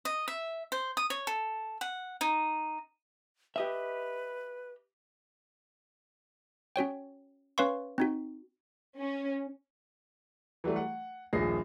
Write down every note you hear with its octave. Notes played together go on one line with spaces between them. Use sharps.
D#5
E5
C5
D#6
C#5
A4
F#5
D#4
G4 B4 D#5 E5
C#4 F#4 C#5 G5
C#4 B4 C#5 F5 C6 C#6
C4 D#4 F#4
C#4
E3 F#3 G3 A3
F#5
D#1 A#1 G#4 A#6 C7